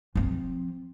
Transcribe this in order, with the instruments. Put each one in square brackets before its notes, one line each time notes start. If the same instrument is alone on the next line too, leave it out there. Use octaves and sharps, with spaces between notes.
[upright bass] F3 C4